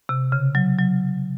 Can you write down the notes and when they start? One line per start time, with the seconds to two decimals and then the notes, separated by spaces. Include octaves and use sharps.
0.09 C3
0.32 C#3
0.55 F#3
0.78 F#3